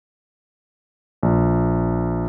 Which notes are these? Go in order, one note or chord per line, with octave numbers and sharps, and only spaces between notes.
A#1